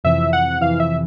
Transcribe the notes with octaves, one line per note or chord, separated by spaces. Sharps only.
F2 C3 E3 E5
F#5
F2 C3 E3 F5
E5